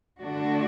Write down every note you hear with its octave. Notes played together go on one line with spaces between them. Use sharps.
D3 A3 D4 F#4